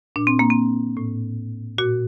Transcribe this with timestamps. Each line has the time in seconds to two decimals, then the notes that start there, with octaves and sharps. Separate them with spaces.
0.16 A#2 D4
0.27 C4
0.39 A#3
0.50 C4
0.97 A2
1.78 A#2 F#4